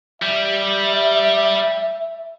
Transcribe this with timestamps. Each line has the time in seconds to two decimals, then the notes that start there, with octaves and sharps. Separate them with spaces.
0.22 G3 E5